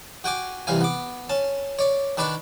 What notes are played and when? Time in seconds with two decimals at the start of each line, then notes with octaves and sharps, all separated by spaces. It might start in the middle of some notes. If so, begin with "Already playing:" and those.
0.24 F#4 G5 G#5 D6
0.67 C2 C3 E3 F5 G#5
0.81 B3 D6
1.29 C#4 A5
1.79 C#5 D5
2.17 D#3 D4 B4 D5 C#6